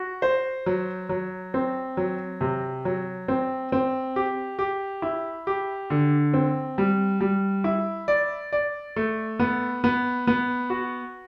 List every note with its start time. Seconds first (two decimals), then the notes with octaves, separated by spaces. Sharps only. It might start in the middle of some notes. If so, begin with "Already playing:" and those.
Already playing: F#4
0.22 C5
0.66 F#3
1.09 F#3
1.54 C4
1.97 F#3
2.41 C3
2.85 F#3
3.28 C4
3.72 C4
4.16 G4
4.59 G4
5.02 E4
5.47 G4
5.90 D3
6.34 C4
6.78 G3
7.21 G3
7.64 E4
8.08 D5
8.53 D5
8.96 A3
9.39 B3
9.84 B3
10.27 B3
10.70 F#4